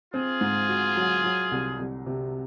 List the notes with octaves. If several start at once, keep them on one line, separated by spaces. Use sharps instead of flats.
C4 F4 G#4
G#2
F#4
F#3
F#3
C2
C2
C3